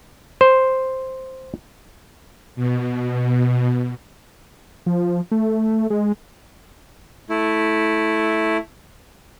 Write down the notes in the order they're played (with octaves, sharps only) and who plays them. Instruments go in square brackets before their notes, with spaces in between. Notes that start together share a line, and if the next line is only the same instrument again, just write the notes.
[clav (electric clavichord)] C5
[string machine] B2
[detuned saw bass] F3
A3
G#3
[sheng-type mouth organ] A3 E4